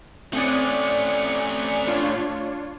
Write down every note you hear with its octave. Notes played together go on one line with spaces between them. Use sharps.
A3 C4 C#4 D5 G#5 D#6 F#6 C#7
D4 F4 C#5